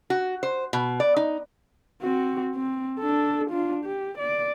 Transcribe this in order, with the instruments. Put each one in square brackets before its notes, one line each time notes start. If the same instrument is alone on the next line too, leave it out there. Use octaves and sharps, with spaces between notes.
[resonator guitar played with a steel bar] F#4
C5
B2
D5
D#4
[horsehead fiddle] C4 F#4
C4
D4 A4
D4 F4
G4
D5